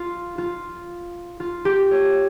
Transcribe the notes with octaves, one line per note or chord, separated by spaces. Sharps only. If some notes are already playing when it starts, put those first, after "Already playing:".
Already playing: F4
F4
F4
G4
C#5